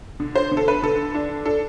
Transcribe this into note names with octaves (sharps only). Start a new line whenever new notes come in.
D3
C5
D3
A4
B4
D3 A4
D4
D4 A4